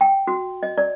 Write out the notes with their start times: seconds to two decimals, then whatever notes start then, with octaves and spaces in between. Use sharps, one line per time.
0.01 G5
0.27 F#4
0.63 D#5
0.78 D5